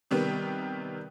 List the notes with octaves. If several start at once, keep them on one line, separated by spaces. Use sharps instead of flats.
C3 D#3 G3 B3